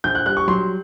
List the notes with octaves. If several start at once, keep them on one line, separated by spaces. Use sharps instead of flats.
A#1 G6
F#6
G3 F#6
C#6
F#3 C6